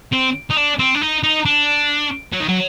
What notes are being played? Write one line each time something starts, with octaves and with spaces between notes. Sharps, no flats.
C4
D#4
D4
C4
D4
D#4
D#4
D4
F#3
D#3
F#3